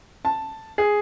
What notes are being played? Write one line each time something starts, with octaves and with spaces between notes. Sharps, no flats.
A5
G#4